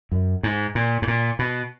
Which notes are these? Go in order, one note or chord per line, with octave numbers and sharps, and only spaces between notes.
F#2
G#2
A#2
G#2
A#2
B2